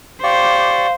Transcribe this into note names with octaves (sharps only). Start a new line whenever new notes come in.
G4 C5 D5 F5 C#6